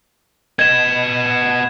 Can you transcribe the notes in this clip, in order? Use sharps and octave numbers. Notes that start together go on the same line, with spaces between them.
B3 D#5 G#6 E7